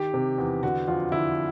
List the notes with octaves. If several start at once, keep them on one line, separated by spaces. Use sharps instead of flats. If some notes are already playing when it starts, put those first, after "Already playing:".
Already playing: D#3 G4
C3
E2
D3 F#4
F2 F4
D3 E4